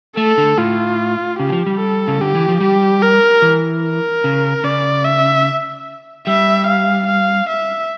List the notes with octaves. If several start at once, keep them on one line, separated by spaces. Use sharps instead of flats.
A3 A4
D3
A2 F4
C#3 G4
E3
F3
G3
A4
C#3
D3 G4
E3
F3
G3 G4
A#4
E3
A#4
C#3
C#3 D5
E5
G3 E5
F5
F5
E5